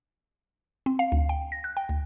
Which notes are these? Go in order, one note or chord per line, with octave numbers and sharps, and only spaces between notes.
C4
F5
D2
G5
A#6
F#6
G5
D2